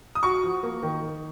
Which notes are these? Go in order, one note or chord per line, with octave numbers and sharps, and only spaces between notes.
D#6
F#4 C#6
F3
A#3
D#3
D#3